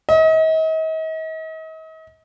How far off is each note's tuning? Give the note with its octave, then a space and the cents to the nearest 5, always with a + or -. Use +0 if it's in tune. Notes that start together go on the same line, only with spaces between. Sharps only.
D#5 +40